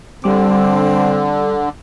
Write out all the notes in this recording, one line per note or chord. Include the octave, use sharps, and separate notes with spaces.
D3 G3 C4 D6